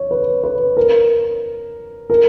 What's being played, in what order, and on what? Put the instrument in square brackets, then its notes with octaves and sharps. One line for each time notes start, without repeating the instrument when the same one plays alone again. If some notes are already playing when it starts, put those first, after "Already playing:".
Already playing: [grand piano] C#5
B4
B4
A#4
A#4